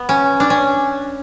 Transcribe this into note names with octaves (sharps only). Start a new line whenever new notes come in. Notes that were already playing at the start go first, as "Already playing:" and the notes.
Already playing: B3
C#4
D4
C#4